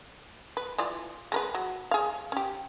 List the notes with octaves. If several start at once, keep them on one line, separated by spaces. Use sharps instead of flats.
B4
E3 F4 D5
G#3 A#4 B4
F#3
G#4 F5
C#4 G4